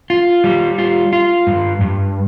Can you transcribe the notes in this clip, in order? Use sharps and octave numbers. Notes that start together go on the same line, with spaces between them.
F4
G3
F4
F4
G2
G2